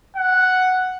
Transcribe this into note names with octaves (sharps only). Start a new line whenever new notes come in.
F#5